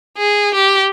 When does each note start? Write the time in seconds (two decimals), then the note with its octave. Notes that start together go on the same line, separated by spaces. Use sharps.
0.17 G#4
0.55 G4